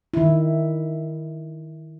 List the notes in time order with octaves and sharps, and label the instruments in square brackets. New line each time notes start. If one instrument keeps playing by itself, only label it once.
[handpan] D#3 E4